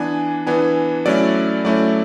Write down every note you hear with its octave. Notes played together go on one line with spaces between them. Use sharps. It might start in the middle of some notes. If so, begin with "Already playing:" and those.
Already playing: E3 B3 D4 G#5
E3 B3 D4 G#5
F#3 A3 C#4 E4 D5
F#3 A3 C#4 E4 D5